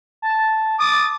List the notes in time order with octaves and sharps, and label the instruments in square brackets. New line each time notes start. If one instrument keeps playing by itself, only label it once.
[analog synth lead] A5
[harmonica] D6 D#6 [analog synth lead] A6